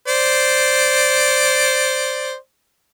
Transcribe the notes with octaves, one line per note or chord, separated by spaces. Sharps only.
C5 D5